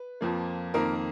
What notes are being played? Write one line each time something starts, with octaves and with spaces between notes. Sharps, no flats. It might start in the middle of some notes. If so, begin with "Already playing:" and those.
Already playing: B4
F2 F3 A#3
F2 D#3 A#3 A#4